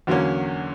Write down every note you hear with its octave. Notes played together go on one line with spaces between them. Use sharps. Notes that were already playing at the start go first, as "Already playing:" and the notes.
E2 D3 F#3 A#3 C#4